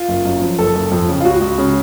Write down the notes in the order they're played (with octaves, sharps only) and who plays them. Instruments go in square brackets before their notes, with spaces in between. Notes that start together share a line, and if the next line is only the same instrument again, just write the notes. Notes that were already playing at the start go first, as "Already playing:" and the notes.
Already playing: [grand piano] F4
F#1
F#2
F3
F#1 A4
F#1
F2
C#3
F4
C#2 F#4
C#2
C#3